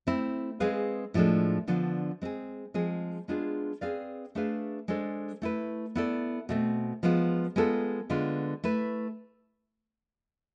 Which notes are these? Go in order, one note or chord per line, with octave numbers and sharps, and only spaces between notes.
A3 C4 E4
G#3 C4 G#4 B4 F5
A2 F3 G#3 D4 A4
D3 F3 B3 D4 F4
G#3 C4 G#4
F3 G#3 C4 G#4
G#3 B3 D4 F4 G#4
C4 G#4 B4 D5 F5
A3 D4 G#4 B4 F5
G#3 D4 A4 C5
A3 E4 B4
B3 E4 A4 D5
B2 A3 C4
F3 G#3 B3 F4
G#3 B3 F4 A4
D3 G#3 B3 F4
A3 E4 B4